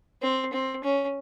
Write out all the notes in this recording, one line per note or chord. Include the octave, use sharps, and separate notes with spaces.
C4
C4
C#4